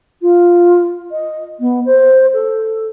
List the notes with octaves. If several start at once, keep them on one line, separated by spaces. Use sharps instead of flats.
F4
D#5
B3
C5
A4